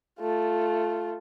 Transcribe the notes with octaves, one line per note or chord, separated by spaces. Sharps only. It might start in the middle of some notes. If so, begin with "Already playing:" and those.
A3 F4